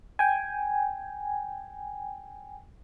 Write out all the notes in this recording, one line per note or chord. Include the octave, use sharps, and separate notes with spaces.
G5 G#5